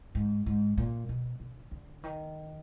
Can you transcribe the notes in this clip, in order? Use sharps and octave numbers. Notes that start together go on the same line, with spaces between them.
G#2
G#2
A#2
B2
D3
D3
D#3